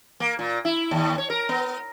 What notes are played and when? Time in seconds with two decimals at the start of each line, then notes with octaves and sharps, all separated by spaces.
0.20 A#3
0.39 A#2
0.65 E4
0.91 D#2
1.18 C#5
1.30 A#4
1.49 B3